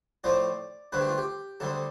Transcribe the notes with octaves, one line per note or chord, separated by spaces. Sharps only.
A2 F3 C4 F4 D5
G2 D3 A3 C4 B4
G4
F4
G4
D2 D3 G3 C4 A4